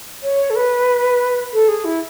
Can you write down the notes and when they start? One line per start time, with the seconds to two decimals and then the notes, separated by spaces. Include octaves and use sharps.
0.23 C#5
0.50 A4
0.56 B4
1.53 A4
1.68 G#4
1.84 E4